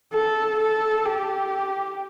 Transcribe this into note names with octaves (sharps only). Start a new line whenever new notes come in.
A4
A4
G4